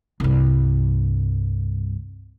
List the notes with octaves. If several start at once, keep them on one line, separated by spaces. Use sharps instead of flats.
C2 G2